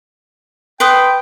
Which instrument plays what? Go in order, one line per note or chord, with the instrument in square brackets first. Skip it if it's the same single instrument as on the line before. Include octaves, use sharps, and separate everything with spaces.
[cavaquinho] B4 C6 D#6 [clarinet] G5